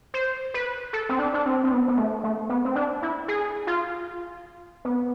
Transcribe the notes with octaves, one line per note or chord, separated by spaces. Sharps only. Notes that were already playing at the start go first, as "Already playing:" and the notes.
C5
B4
A4
C4
D4
D4
C4
C4
B3
B3
A3
A3
B3
C4
D4
E4
G#4
F4
B3